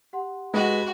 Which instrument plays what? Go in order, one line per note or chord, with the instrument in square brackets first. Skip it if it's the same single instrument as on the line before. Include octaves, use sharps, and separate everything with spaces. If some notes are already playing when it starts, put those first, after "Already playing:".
[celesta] G4 F#5 C6
[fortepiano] G#3 [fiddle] F#4 [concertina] B4